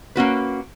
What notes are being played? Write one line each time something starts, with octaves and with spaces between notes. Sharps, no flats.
A#3 C#4 F#4 B4